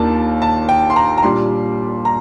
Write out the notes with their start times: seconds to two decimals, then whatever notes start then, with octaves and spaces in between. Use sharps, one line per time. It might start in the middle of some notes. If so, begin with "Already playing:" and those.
Already playing: D#2 D#3 A#3 D4 F4 A5
0.42 A5
0.69 G5
0.90 C6
0.96 A#5
1.18 A#5
1.23 A#2 G3 D4 F4 C6
2.05 A#5